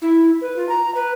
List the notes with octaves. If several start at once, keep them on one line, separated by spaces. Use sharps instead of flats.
E4
B4
F4
A#5
B4